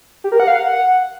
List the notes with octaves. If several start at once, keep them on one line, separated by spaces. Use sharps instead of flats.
G4
A#4
F#5
F5
F#5